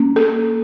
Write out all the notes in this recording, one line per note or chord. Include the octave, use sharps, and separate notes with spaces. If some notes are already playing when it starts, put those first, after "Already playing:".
Already playing: A#3 C#4
A4